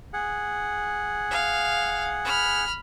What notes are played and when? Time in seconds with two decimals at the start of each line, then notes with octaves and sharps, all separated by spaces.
0.13 G#4 F#5
1.31 F5
2.25 B5 F6